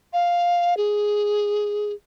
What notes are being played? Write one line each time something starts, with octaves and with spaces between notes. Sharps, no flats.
F5
G#4